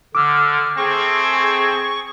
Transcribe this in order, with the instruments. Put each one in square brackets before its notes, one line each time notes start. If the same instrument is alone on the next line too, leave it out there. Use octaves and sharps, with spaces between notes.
[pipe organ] D3 [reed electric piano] D6 E6 [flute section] F6
[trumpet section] A3 C4 [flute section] G#4 [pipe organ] C#6